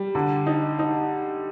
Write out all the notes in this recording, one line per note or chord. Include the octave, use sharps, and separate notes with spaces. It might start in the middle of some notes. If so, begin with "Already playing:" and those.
Already playing: G3
D3
D#4
D#4